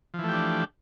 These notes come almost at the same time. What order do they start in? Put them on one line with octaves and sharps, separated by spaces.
F3 E3 A3 G4 D4